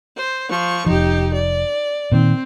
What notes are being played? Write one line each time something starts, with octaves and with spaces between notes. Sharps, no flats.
C5
F3 C#6
F1 F3 D#4 G4
D5
A#2 D#3 C4